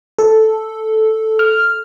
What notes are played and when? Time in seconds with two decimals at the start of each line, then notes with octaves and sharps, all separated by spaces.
0.19 A4
1.39 F6